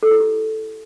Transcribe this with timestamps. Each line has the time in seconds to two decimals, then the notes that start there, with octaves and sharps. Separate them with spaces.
0.03 A4
0.11 E4
0.20 G4